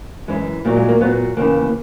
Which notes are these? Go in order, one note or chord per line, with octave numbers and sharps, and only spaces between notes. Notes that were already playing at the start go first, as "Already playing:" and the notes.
F#2 E3 G#3
A#2 F#3 A#3
G#3
A#3
A#2 F#3 B3
D#2 C#3 E3 A#3